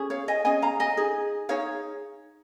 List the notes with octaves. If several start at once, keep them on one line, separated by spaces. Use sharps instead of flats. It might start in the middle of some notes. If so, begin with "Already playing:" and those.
Already playing: C#4 G#4
C#5 F5
D#5 G#5
C#4 G#4 D#5 G#5
F5 A#5
D#5 G#5
D#4 G#4
D#4 G#4 C#5 F5